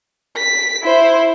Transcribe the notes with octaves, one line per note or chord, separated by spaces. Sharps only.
B6
E4 C5